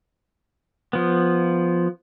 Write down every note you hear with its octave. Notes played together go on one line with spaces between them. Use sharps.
F3 B3